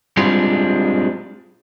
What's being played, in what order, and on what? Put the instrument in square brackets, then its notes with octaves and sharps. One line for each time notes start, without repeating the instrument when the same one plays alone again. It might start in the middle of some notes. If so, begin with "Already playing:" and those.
[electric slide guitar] G3 G#3 C4 D4 F4